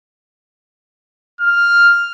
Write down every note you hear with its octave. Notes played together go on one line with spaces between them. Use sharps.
F6